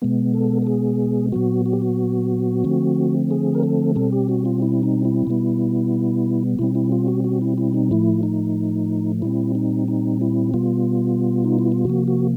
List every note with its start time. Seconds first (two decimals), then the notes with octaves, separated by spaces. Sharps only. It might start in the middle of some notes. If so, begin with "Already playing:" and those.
0.02 B2 G#3 B3
0.34 A4
0.62 A4
0.67 G#4
1.32 A#2 F#3 B3 F#4
1.66 F#4
1.73 G4
1.82 F#4
2.64 D3 F3 A3 C4
3.31 G#4
3.54 A#4
3.63 A4
3.95 B2 G3 C4 A4
4.12 G4
4.29 F#4
4.45 F4
4.62 E4
4.83 D#4
5.05 E4
5.27 B2 G3 B3
6.59 B2 G3 C4 E4
6.75 E4
6.92 F4
7.08 F#4
7.24 F#4
7.41 E4
7.58 E4
7.74 D#4
7.91 A2 F3 A3 E4
8.23 D#4
9.22 A#2 G3 C4 E4
9.55 D#4
9.88 D#4
10.21 E4
10.54 B2 G3 B3 F4
11.44 D#4
11.59 E4
11.72 F4
11.85 C3 F3 A#3 F#4
12.08 F#4